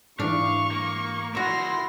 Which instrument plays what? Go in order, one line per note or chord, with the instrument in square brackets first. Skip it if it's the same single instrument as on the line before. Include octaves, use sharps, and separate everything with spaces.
[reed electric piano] G#2 E3 [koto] D4 [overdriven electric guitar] F5 [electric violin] C#6
[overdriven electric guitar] A#3
[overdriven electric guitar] E4 A#4 [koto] F#4 E5 [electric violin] C6 A#6